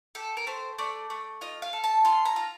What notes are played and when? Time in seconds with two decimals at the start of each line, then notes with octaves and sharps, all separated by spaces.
0.15 G4 A4
0.37 A#4
0.47 A3 C5
0.78 A3 D5
1.10 A3
1.41 F4 D#5
1.62 F5
1.73 A4
1.84 A5
2.05 F4 C6
2.25 A#5
2.36 F4